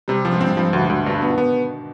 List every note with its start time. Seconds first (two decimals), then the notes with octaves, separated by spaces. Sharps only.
0.08 C3 G3
0.25 F3
0.32 G#2
0.40 G2 C4
0.47 G#2
0.57 G2 F3
0.73 D2 B2
0.81 G#2
0.90 D2
1.06 G2 B2
1.18 D3 B3
1.30 D#3
1.38 B3